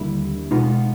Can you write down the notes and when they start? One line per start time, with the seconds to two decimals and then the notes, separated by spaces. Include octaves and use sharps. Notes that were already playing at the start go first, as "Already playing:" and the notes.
Already playing: D#2 D3 G3 A#3 D4 E4
0.51 B2 G#3 B3 D#4 F4